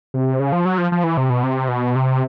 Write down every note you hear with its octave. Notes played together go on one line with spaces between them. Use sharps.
C3
C#3
F3
F#3
F3
F3
E3
C3
B2
C3
B2
C3